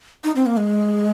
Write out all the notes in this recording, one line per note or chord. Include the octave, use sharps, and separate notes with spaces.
D#4
C4
A#3
G#3